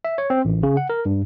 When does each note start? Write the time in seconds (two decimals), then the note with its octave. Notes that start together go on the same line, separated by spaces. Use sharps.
0.05 E5
0.18 C#5
0.30 C4
0.45 A1
0.63 C#3
0.77 F#5
0.90 A#4
1.05 G2